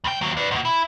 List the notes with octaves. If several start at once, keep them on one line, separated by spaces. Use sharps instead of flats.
C#2 G5
D#2 F#3
B4 D5
G#2 B2
E4